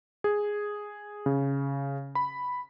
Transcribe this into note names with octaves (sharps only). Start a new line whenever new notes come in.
G#4
C#3
B5